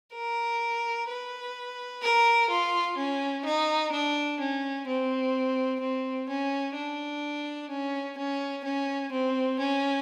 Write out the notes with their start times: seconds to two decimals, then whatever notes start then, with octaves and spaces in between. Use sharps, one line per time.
0.14 A#4
1.08 B4
2.02 A#4
2.49 F4
2.97 C#4
3.45 D#4
3.92 D4
4.40 C#4
4.87 C4
5.81 C4
6.29 C#4
6.75 D4
7.70 C#4
8.17 C#4
8.64 C#4
9.12 C4
9.59 C#4